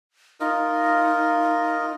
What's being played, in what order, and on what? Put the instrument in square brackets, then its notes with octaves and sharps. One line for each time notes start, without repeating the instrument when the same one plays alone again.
[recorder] D#4 [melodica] F4 A#4 D#5